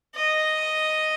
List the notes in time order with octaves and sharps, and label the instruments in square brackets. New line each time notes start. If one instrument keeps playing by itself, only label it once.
[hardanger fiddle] D#5